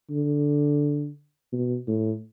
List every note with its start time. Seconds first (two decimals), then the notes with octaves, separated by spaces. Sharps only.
0.10 D3
1.52 B2
1.87 A2